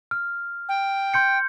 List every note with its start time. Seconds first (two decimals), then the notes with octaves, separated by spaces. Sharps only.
0.11 F6
0.69 G5
1.14 C6 G6 C#7